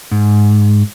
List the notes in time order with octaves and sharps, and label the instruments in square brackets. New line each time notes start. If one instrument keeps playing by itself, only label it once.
[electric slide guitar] G#2